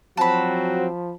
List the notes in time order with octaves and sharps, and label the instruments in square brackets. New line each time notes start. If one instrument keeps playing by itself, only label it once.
[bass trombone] F3 [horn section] F#3 C4 F#4 [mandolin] A5 B5